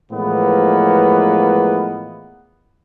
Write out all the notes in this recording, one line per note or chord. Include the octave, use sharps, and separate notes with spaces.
A2 E3 F3 G#3 A#3 B3